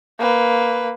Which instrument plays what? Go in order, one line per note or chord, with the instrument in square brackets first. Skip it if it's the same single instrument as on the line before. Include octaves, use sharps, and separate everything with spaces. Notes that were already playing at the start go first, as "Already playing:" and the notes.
[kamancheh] A#3 B4